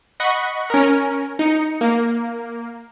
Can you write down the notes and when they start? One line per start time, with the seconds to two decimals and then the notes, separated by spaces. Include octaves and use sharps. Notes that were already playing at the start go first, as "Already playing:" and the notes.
0.20 D#5 F#5 B5 C#6
0.70 C#4 A#4
1.39 D#4 C#7
1.81 A#3